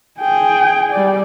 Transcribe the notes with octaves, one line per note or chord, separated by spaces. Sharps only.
G#4 G5
G3 D5